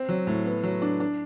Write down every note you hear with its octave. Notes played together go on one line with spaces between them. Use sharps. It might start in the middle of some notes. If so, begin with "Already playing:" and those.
Already playing: C4
F#3
A2
B3
F#3
D4
D4